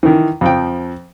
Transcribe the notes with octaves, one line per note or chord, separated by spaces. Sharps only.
D#3 E3
F2 F3 G5